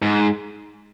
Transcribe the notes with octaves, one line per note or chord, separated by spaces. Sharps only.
G#2